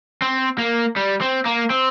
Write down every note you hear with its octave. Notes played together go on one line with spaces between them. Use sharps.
C4
A#3
G3
C4
A#3
C4